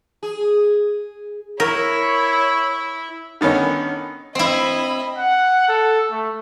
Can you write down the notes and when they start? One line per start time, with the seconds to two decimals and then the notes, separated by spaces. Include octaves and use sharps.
0.23 G#4
1.60 E4 A#4 C#5
3.41 D3 D#3 B3 C#4 D#4
4.35 C4 E4 D#5 B5
5.18 F#5
5.69 A4
6.11 A3